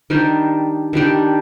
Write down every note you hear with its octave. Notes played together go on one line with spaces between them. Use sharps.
D#3 G3 D4 G4
D#3 G3 D4 G4